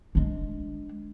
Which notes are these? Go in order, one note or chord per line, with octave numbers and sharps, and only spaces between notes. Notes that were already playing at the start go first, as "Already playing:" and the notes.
G#3 D4